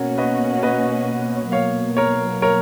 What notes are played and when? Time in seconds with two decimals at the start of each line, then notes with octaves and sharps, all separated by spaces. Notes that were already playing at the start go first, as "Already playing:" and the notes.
Already playing: B2 A#3 C#4 F#4 A#4 C#5
0.18 B4 D#5
0.63 B4 D#5
1.52 B2 F#3 A#3 C#5 F5
1.97 A#4 C#5
2.42 A#4 C#5